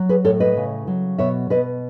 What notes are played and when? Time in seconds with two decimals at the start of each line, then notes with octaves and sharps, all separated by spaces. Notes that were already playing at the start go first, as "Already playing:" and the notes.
Already playing: F#3
0.09 G#4 B4
0.24 A2 A4 C#5
0.40 B4 D#5
0.57 C#3
0.87 F#3
1.18 B2 C#5 E5
1.50 B2 B4 D#5